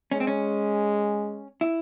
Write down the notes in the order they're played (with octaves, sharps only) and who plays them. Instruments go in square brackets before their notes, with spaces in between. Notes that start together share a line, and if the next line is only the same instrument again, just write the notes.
[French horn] G#3 [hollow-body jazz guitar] C#4
[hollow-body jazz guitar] C4
C#4
E4